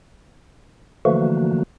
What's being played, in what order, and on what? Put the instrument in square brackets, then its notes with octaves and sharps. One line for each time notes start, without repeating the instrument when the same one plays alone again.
[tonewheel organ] D3 E3 F3 A3 A#3 F#4